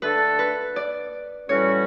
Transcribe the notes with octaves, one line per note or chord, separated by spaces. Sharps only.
D3 A3 D4 A4 B4
B4
D5
A2 E3 G3 C#4 F#4 C#5